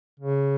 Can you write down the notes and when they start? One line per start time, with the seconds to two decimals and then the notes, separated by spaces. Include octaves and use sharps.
0.20 C#3